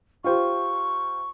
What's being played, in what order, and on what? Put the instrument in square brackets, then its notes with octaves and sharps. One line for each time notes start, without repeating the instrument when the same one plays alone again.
[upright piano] F4 G4 C5 [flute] C#6